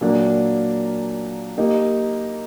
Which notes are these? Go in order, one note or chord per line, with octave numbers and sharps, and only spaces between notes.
A#2 F#3 A#3 D4
A#3 D#4 G4